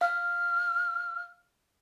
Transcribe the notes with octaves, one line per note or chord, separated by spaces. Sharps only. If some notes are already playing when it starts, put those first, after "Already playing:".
F5 F6